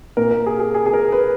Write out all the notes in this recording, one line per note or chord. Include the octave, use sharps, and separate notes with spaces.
A#2 A#4
A#4
G#4
G#4
G#4
G#4
A#4
B4